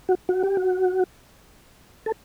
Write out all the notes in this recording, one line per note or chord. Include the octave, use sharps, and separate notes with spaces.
F#4
F#4
G4
F#4
A4